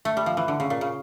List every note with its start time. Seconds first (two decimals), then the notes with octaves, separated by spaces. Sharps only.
0.05 A3
0.17 G3
0.26 F3
0.37 E3
0.48 D3
0.60 C#3
0.70 A#2
0.81 C#3